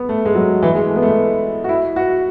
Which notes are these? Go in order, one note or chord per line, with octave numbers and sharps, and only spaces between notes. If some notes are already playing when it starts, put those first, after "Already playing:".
Already playing: B3
A3
G#3
F#3
E3
G#3
A3
B3
A3
F#4
E4
F#4